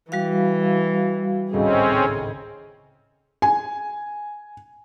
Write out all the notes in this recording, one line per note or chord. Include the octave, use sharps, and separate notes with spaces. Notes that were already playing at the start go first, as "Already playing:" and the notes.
E3 G3 F#4 F5
G#1 C#2 A2 C4 C#4 G#4
G#5